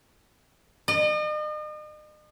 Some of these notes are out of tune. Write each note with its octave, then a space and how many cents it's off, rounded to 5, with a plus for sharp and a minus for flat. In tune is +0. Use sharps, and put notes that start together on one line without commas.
D#5 -40